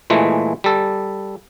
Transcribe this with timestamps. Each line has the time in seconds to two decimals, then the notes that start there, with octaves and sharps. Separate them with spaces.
0.10 A#2 E3 G#3 A3
0.64 G3 A4